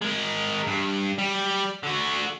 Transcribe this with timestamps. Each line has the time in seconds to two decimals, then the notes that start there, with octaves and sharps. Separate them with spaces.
0.02 G#3 A#4
0.67 G2
1.18 G3
1.83 D3 F#4